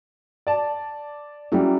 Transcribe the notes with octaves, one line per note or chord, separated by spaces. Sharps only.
D5 A5
F#3 G3 C#4 E4 G#4